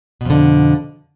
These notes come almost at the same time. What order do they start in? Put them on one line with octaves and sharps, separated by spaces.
B2 F2 D3